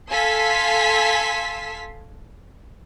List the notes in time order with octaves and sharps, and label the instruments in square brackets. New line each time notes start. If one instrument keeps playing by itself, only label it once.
[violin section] A4 F5 G#5 C6 E6 B6